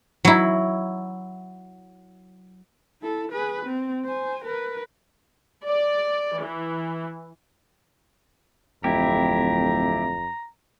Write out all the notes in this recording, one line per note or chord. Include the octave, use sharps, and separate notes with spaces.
F#3 E4
E4 A4
G#4 B4
C4
C5 G#5
A#4 B4
D5
E3
D1 F2 E4 G4 A#5